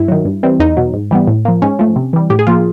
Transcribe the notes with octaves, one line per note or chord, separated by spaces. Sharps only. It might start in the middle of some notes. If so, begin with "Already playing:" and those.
Already playing: G2 E4
D#3 F#3
G2
E3 G3 C4
E2 D#4
B2 F#3
G#2
E3 G3 B3
A2
F3 A#3
G#2 C#4
F3 A3
C3
E3 G3
A2 G4
G#4
F3 A#3 F4